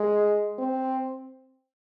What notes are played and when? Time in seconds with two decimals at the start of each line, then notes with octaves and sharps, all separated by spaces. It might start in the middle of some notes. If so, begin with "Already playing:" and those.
Already playing: G#3
0.58 C4